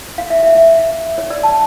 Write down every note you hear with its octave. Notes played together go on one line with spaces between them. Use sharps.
F5
E5
E5
E5
C#5
D5
A5